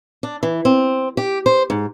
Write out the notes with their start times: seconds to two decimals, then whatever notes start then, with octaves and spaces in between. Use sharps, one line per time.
0.23 D4
0.43 E3
0.65 C4
1.17 G4
1.46 C5
1.70 G#2